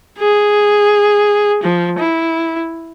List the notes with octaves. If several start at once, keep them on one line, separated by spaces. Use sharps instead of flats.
G#4
F3
E4